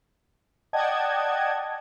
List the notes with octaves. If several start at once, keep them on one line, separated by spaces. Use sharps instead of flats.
D5 D#5 F#5 G5 A5 G#6